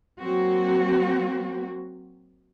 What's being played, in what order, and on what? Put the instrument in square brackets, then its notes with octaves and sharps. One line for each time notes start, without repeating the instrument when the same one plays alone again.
[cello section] F#3 A#3 C4 F#4